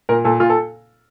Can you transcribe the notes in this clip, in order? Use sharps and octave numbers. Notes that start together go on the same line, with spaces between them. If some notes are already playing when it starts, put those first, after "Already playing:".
A#2 A#4
A#2 A4
A#2 F4
A4